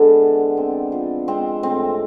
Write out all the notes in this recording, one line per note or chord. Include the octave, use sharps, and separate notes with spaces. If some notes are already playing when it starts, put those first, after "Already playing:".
Already playing: D3 G#3 B3 D4
E3
C4
F3
G#3 C4
A2 C4